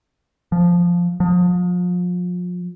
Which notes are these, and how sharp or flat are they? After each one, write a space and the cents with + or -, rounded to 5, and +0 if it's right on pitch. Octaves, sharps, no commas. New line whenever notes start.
F3 +0
F3 +35